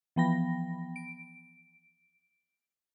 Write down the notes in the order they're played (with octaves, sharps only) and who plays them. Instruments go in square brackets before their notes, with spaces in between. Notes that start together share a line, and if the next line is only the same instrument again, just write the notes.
[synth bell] E3 F3 B3 G5 B5 A#6
D7